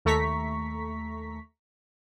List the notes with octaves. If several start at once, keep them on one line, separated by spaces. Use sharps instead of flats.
D#2 A3 A#5 C#6 B6